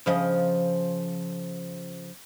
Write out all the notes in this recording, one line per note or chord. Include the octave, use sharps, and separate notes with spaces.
C#3 F3 D#5